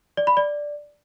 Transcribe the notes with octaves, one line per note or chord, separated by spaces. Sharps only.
D5
B5
D5